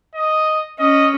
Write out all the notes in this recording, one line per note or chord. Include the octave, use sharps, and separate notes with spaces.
D#5
C#4 D#5